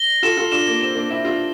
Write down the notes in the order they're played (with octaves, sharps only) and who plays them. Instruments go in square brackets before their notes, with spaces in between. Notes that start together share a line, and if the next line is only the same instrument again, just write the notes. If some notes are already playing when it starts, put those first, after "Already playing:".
Already playing: [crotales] A#6 G7
[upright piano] F4 A4 [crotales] E7
[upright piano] F4 A4
[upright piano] D4 F4 [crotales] E7
[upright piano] A#3
[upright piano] C4 [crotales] E7
[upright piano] A#3 D4
[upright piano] C4 E4 [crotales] E7
[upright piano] D4 F4